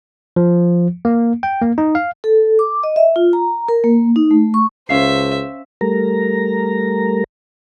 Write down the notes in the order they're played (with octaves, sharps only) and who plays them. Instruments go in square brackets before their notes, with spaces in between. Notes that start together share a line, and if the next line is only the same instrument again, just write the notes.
[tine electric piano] F3
A#3
G5
A#3
D#4
F5
[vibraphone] A4
D6
D#5
E5
F4
A#5
A#4
A#3
D#4
A3
C#6
[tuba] C#2 [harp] C#4 F5 C7 [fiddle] C5 E5
[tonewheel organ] G3 A3 A#4 A#5